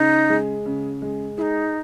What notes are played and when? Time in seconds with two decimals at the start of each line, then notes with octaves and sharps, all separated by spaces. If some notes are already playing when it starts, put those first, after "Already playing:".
Already playing: C#3 D#4
0.30 G#3
0.66 C#3
1.02 G#3
1.37 D#4 E4 G#4